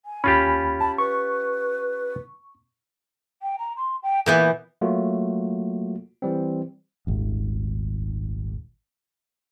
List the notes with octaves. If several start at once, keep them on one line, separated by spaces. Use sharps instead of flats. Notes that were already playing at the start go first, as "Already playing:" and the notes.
G#5
D#2 C#4 F4 G4 B5
A5 B5
B4 C#6
G5
A#5
C6
G5
A#2 E3 B3 G6
F#3 A3 A#3 F4 F#4
E3 G3 C4
D#1 G#1